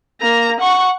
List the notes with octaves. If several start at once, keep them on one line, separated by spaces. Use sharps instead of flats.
A#3 A#5
F#5 C#6